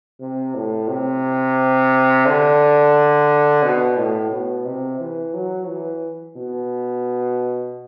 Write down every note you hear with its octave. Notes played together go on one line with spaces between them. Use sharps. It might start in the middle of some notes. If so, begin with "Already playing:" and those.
C3
A2
C3
D3
B2
A2
B2
C3
E3
F#3
E3
B2